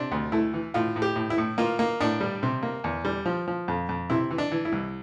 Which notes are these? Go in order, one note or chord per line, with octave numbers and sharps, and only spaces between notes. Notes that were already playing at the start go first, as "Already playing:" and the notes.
Already playing: C3 D4
D2
A3 E4
E3
A2 F4
A2
G4
A2
E4
A2
A#3 F4
A#3
A2 D4
G3
C3
A#3
E2
G3
F3
F3
F2
F2
C3 E4
E3
D4
E3
E4
C2